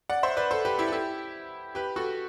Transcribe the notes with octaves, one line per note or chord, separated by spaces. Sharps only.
D5 F#5
C5 E5
B4 D5
A4 C5
G4 B4
E4 G4
A4
E4 G4
G4 B4
F#4 A4